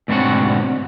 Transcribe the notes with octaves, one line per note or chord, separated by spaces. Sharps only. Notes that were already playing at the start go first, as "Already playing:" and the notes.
D2 G#2 B2 C4 C#5 F#5